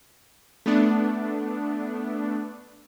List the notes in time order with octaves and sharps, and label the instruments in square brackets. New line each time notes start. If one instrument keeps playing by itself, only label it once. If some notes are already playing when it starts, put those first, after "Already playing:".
[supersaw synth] A3 B3 D4